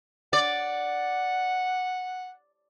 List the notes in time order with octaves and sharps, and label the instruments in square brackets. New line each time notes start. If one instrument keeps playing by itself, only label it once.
[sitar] D5 [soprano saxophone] F#5